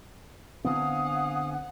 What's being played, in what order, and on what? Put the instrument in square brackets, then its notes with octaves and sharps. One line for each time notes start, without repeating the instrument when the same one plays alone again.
[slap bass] D3 B3 C4 [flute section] F5 G#5 D#6 [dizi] F#5